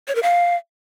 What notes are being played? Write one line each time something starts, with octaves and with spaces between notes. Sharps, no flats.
C#5
A#4
F5